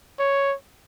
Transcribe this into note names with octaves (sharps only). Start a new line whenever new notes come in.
C#5